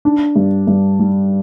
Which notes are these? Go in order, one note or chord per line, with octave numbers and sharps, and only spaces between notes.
D4
G2
G2
G3